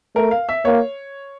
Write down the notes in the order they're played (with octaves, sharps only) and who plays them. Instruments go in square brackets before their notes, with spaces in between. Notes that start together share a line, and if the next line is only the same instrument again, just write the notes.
[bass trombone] A3 [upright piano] A#4
[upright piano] F5
E5
[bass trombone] A#3 [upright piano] C#5